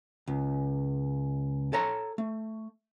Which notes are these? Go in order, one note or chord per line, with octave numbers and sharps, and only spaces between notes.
C#2
A4 C#5 A#5
A3